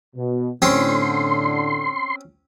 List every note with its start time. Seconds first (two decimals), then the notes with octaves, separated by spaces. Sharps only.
0.16 B2
0.62 A2 D3 C4 C#4 G4 C6